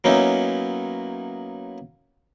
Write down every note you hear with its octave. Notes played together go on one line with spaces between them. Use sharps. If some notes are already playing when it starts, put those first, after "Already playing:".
F#3 A#3 B3 C#4 D#4 E4